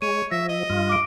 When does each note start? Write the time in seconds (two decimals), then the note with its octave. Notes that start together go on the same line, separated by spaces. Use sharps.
0.02 G#3 C#5 D#7
0.31 F3 E5 A#6
0.49 D#5
0.70 G2 F4
0.89 D6 D7